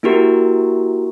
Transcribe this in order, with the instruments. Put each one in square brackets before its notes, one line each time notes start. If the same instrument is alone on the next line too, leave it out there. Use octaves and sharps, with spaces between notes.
[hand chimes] A#3 E4 F#4 G4 A#4